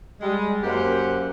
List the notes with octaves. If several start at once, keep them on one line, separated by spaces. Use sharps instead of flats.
G3 G#3
F#2 A#3 G4 C5 F#5